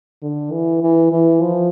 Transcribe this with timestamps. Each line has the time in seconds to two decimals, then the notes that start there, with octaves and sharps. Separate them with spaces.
0.22 D3
0.51 E3
0.83 E3
1.12 E3
1.41 F3